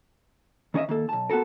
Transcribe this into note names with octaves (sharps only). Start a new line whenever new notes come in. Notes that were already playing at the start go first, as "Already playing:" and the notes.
D#3 C#4 C#5 D#5 E5
D#3 A#3 A4
B1 A5
B3 F#4 G4 A4 A#4